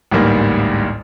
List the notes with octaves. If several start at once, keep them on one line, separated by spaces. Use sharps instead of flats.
A1 D2 G#2 G3 A#3